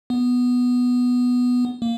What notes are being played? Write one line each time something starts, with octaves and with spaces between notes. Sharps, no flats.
B3
A#3